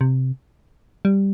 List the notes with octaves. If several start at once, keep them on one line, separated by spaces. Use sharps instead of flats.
C3
G3